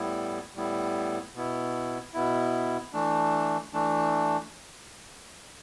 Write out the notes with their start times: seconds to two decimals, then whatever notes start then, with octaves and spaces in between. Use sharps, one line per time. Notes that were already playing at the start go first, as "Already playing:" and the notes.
Already playing: A2 G3 B3 E4
0.55 A2 G3 B3 E4
1.35 B2 B3 E4
2.14 B2 B3 E4
2.93 E3 A3 D4
3.74 E3 A3 D4